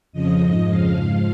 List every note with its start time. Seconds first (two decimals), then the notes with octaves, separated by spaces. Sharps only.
0.13 F2 C#3 F3 D#5
0.41 G#2 F3
0.69 F2 C#3 F3 F5
0.97 G#2 F3 F5